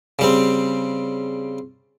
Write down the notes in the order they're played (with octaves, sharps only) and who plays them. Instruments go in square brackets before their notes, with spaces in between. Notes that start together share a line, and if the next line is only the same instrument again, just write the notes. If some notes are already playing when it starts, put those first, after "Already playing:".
[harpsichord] C#3 G3 C4